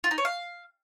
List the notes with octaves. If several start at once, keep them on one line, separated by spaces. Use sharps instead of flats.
F4
D#4
C#5
F5